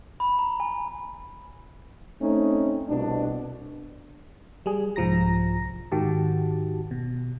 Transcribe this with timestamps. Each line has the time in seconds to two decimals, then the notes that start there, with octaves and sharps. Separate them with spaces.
0.20 B5
0.39 A#5
0.60 G#5
2.21 A3 C4 C#4 D#4
2.87 C2 B2 D4
4.66 G3 G#4
4.96 C2 G#2 F3 A#5 A#6
5.92 G#2 D#3 F#4 G4 A5
6.91 B2